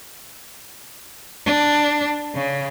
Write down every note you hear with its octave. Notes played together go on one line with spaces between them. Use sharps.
D4
C#3